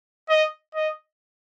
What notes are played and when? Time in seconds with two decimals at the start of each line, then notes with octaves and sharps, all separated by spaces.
0.29 D#5
0.75 D#5